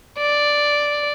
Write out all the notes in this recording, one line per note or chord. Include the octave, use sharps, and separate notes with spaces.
D5